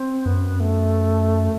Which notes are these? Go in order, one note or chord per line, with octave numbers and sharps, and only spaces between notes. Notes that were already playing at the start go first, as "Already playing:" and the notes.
Already playing: C4
F#2 B3
A3